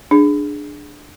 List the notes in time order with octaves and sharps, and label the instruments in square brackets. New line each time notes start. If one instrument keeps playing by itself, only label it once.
[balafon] D4 G#4